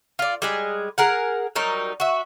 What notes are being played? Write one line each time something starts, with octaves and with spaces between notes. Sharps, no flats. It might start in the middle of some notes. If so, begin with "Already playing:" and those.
F4 D5
G3 G#3 G#4
G#4 A#4 F#5
F#3 G3 D#4 A#4
F#4 E5